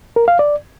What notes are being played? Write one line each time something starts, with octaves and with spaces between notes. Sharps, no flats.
A#4
F5
D5